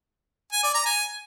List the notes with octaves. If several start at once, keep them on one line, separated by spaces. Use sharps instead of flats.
G#5
D5
A#5
G#5